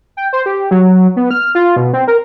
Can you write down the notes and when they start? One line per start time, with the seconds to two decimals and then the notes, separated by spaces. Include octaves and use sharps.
0.17 G5
0.33 C5
0.46 G4
0.71 F#3
1.16 B3
1.31 F6
1.55 F4
1.76 B2
1.93 C4
2.08 A#4